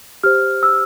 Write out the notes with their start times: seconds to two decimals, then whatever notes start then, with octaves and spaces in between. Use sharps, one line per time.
0.24 G4 C5 F6
0.63 E6